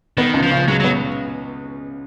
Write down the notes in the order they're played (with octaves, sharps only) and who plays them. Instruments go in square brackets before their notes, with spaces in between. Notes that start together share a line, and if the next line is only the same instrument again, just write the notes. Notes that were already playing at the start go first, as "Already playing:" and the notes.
[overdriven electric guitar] D#3 [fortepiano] B3
[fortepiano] C#2
[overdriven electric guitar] F3
[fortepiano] C#3
[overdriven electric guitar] F#3 [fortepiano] G#3
[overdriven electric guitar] F#3 [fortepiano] B3